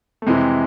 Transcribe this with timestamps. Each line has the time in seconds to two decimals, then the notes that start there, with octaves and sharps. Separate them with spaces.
0.22 A3
0.27 F2 C3 E3 G#3